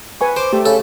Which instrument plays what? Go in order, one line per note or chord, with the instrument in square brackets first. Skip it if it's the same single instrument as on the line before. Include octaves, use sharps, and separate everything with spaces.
[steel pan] B4 G#5 C#6
[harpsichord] C5 [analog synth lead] D6
[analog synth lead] A3 [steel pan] G4
[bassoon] C#3 [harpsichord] A4